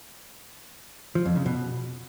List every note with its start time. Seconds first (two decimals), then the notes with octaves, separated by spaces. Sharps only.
1.15 F3
1.25 F2
1.36 C#3
1.46 B2